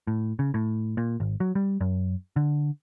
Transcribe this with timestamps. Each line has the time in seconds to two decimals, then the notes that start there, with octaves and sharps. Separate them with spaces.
0.07 A2
0.39 C#3
0.54 A2
0.97 A#2
1.20 G#1
1.40 F#3
1.55 G3
1.81 F#2
2.36 D3